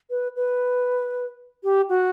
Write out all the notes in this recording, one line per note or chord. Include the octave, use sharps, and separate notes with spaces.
B4
B4
G4
F#4